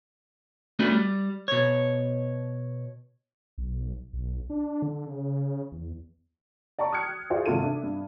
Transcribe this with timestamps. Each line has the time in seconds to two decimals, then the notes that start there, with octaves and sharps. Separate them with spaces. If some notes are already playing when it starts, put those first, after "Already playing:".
0.79 A3 B3 C#4 D4 F#4 B4
0.91 G3
1.48 B2 C#5
3.58 B1
4.13 B1
4.50 D4
4.82 D3
5.07 C#3
5.72 E2
6.79 D5 A5 A#5 C#6
6.92 D#6 F6 F#6 G#6 C#7
7.30 F4 F#4 G#4 C5 D5 E5
7.46 G#1 C3 F4 F#4 A4 D#7
7.63 D4 E5
7.83 G2